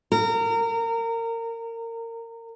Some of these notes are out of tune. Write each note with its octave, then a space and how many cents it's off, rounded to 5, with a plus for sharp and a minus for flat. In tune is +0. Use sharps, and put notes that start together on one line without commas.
A#4 -25